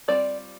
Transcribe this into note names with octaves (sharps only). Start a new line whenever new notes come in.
G3 C4 F4 D5